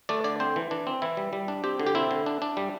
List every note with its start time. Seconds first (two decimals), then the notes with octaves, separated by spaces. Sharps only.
0.09 A3 D5
0.24 D3 D5
0.40 C4 C5
0.56 E3
0.71 E3 D4
0.87 C4
1.02 E3 E4
1.17 G3
1.33 G3
1.48 D4
1.64 C4 G4
1.80 D3
1.87 G4
1.95 C4 E4
2.11 D3
2.26 D4
2.42 D4
2.57 G3